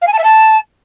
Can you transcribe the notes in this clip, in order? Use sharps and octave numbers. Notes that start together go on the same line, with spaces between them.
F5
G#5
A5
E5
A5